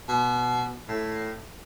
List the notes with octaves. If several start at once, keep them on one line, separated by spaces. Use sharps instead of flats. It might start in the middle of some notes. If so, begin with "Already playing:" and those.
B2
A2